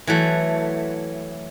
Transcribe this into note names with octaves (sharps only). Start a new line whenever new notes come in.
E3 F#3 A3